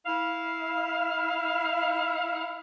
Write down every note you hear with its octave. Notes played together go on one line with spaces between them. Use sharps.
E4 F5